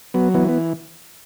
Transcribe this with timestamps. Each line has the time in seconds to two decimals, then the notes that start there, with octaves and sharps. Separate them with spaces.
0.14 F#3 B3
0.34 E3 B3
0.49 B3